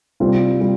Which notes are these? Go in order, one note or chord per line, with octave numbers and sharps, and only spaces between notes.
C3 G3 C4 F4
G3